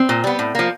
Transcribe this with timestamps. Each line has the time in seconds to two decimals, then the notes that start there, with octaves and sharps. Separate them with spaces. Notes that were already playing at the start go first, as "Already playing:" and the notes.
Already playing: C4
0.09 A#2
0.24 G3 B3
0.39 A2
0.55 F3 A#3